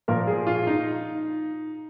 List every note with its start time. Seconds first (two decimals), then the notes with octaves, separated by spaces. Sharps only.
0.08 A#2 F3 A#4
0.27 G#4
0.47 F4
0.67 D#4